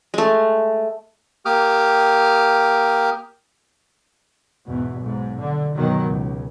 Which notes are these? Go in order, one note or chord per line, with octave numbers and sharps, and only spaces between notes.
G#3 A3
A#3 G4 D6 D#6 F6
E2 G#2 B2
B1 G#2
D3
G2 B2 D#3 F#3
C#2